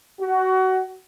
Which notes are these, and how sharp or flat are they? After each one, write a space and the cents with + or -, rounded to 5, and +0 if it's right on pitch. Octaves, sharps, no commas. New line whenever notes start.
F#4 +25